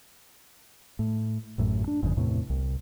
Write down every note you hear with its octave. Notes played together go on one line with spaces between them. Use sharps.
A2
A1 F#2 A2
D4
G1 F2 G#2 C#3
E2 A2 C3
C2